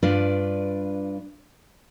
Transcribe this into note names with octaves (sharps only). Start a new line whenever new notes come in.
G2 D4 F4 B4 D5